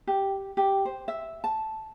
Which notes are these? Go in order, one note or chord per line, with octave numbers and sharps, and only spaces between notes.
G4
G4
C5
E5
A5